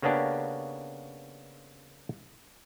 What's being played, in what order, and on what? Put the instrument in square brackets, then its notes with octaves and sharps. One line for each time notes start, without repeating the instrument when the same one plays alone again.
[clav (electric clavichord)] C#3 A#3 B3 C#4 D4 G4